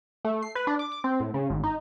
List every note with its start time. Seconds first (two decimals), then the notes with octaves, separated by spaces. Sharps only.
0.25 A3
0.42 C7
0.55 B4
0.67 D4
0.79 D6
0.92 D6
1.04 C4
1.20 A2
1.34 C#3
1.50 G#1
1.64 D#4